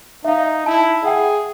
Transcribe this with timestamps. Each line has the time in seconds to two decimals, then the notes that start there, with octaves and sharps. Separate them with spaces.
0.24 D#4 E5 F5
0.66 E4 A5
1.03 G#4 E5 F#5 G5